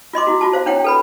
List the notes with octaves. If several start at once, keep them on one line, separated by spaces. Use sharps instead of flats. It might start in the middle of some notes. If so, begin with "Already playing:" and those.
F4 D#5 C6 D6
E4 F#4
F4 F#4 A5
C5 F5
D4 E4 C#5 F#5 G5
A4 B4 B5